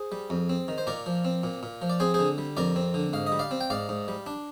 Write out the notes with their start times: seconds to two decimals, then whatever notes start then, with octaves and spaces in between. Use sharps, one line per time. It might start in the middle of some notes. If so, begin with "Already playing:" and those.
Already playing: G#4 C5
0.12 G3
0.30 F2
0.49 C4
0.68 D#3
0.78 C5
0.87 A#2 A#4 D5
1.06 F3
1.25 C4
1.43 A#2
1.63 A#2
1.82 F3
1.90 D5
2.00 C4 G#4 C5
2.14 D3 G#4 C5
2.38 G3
2.57 F2 A#4 D5
2.76 C4
2.94 D3
3.13 G#2 F5
3.27 D#5
3.32 G3
3.39 D5 F5
3.51 C4
3.61 G5
3.70 G#2 D5 F5
3.89 G#2
4.08 G3
4.26 D4